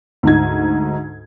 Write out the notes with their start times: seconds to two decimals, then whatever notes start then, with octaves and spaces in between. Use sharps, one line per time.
0.23 D2 G#2 D#4 G#6